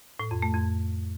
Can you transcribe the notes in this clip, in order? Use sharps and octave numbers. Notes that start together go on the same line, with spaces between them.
A2
F2
A3
F2